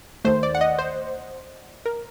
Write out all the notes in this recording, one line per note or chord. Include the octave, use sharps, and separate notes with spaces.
D#2 D#3 A3 C5
D5
F#5
D#5
C5
A#4